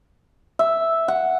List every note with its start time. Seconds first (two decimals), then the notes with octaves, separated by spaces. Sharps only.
0.59 E5
1.08 F#5